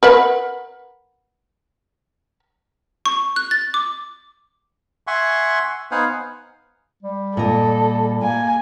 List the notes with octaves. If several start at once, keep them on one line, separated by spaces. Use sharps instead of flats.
A#4 B4 F#5
C#6
F#6
A6
D6
E5 F#5 G#5 C6 C#6
B3 D#4 C5 F5 F#5 G#5
G3
A#2 A4 D#5
A#3 G#5